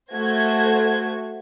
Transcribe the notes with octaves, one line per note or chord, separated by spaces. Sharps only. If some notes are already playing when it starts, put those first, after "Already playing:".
A3 F#4 C5 G#6